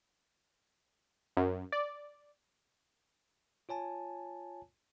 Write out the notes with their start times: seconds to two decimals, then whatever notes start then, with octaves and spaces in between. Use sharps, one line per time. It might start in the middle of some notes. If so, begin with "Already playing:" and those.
1.37 F#2
1.72 D5
3.69 F4 C#5 G#5 A5